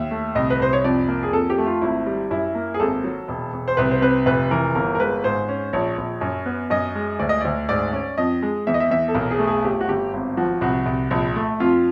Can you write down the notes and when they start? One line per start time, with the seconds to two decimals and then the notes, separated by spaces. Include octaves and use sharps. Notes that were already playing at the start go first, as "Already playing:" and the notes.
Already playing: D#2 E5
0.11 A3
0.35 C2 D#5
0.50 B4
0.60 C2 C5
0.73 C#5
0.84 F2 D5
1.08 A#3
1.23 G#4
1.33 F2 A4
1.50 G4
1.58 A3
1.66 F4
1.81 G#1 E4
2.06 G3
2.31 F#2 E4
2.55 A#3
2.74 G#4
2.80 G#1 A4
3.04 F#3
3.28 E1
3.53 E1
3.68 C5
3.77 C2 B4
3.91 C5
4.01 C4 B4
4.26 F1 B4
4.51 E3 A#4
4.75 G1 A#4
4.95 A#4
5.00 G#3 B4
5.24 G#2 C5
5.49 C#4
5.73 A#1 C#5
5.98 A#1
6.21 F#2
6.46 B3
6.70 F#2 D#5
6.95 G#3
7.19 D2 D5
7.29 D#5
7.41 D2 D5
7.69 G#2 D5
7.93 C#4
8.18 F2 D#5
8.42 G#3
8.67 E2 E5
8.74 D#5
8.80 E5
8.91 E2 E5
9.08 A4
9.15 B1 A#4
9.31 G#4
9.39 A3
9.47 G#4
9.64 G1 G4
9.81 F#4
9.89 G1 G4
10.13 G#1
10.37 F3 F#4
10.61 C2 F#4
10.86 C2
11.11 A#1
11.36 A3
11.60 F2 F4